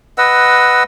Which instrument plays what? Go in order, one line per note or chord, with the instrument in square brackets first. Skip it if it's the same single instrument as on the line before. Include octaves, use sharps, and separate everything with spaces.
[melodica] B4 D#5 F#5 E6